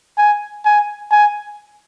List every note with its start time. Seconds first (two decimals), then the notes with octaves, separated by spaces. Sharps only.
0.18 G#5
0.65 G#5
1.11 G#5